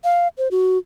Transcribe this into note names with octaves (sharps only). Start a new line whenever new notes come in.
F5
C5
F#4